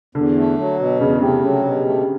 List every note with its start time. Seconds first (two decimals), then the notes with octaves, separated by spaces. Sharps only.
0.15 E2 D3
0.36 A3
0.58 F#3
0.79 B2
1.00 E2 C#3
1.21 C3 A3
1.43 C#3 F#3
1.64 B2
1.86 A3